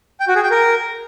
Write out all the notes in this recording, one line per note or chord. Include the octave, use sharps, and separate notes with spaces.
G5
F#4
G#4
G5
A#4